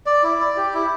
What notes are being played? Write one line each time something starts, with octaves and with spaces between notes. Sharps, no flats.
D5
E4
D5
G4
E4